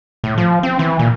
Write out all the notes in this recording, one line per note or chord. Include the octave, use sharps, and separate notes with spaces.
A2
F3
C4
E3
A#2